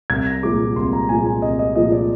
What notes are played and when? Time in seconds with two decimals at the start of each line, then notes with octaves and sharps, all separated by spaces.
0.10 C2 G#6
0.27 A#6
0.43 A#2 F3 G#3 D6
0.76 C2 C6
0.93 A#5
1.09 A#2 F3 G#3 G#5
1.26 G#5
1.42 C2 D#5
1.59 D#5
1.75 A#2 F3 G#3 D#5
1.92 D5